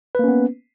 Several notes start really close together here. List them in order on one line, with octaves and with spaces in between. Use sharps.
B4 A#3 C#4 B3